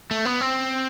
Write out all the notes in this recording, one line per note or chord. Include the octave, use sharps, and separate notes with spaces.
A3
B3
C4